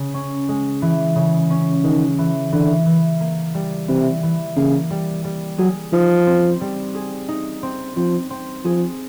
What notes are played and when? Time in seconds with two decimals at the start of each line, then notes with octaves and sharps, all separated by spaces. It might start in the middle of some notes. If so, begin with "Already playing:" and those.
Already playing: C#3
0.14 C#4
0.49 G#3
0.82 E3
1.16 C#3
1.50 C#4
1.84 D#3 G#3
2.18 E3
2.52 D3 E3
2.86 E3
3.20 A#3
3.55 G3
3.88 C3 E3
4.23 E3
4.56 C#3 A#3
4.91 G3
5.25 G3
5.58 F#3 G#4
5.93 F3 D#4
6.27 C4
6.61 G3
6.95 G#4
7.28 D#4
7.63 C4
7.96 F3 C4
8.30 C4
8.64 F3 G#4